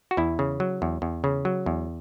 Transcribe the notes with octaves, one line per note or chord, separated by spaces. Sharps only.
F#4
E2 E4
C#3
F#3
E2
E2
C#3
F#3
E2